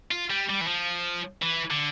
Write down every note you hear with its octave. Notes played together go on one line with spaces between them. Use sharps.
F4
G3
G3
E3
F3
E3
D3